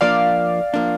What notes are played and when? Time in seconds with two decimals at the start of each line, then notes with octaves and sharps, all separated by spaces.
0.01 F3 A#3 D4 D5 F5
0.74 F3 A#3 D4